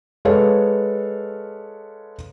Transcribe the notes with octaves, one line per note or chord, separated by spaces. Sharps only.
G#3 A4 B4 C#5 F5